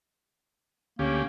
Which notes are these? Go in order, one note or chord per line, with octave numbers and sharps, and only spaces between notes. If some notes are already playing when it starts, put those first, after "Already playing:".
D2 A#3 C#4 G4